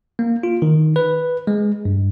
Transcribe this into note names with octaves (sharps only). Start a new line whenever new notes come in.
A#3
F4
D#3
B4
G#3
G2